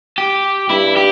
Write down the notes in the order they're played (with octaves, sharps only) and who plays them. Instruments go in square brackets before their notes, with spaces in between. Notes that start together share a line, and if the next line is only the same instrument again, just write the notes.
[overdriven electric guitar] G4
[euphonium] G2 [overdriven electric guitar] E4
[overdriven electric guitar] G4